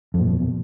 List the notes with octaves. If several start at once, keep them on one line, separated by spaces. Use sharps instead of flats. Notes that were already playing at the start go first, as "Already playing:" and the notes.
F2
A#2
F2
B2